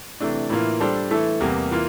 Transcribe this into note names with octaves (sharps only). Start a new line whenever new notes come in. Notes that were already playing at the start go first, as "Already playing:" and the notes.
C3 E3 A3 D4
A2 E3 A#3 F4
G3 D4 A4 C5
E3 A3 E4 A4
E2 C3 G3 A#3
E3 A#3 F4